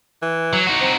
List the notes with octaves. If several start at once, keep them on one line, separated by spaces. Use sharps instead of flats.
E3
F#3
D#4 F#4
C4